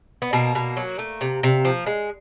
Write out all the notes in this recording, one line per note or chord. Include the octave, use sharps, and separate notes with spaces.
B3
B2 A#3
B2
F#3
A3
C3
C3
F3
G#3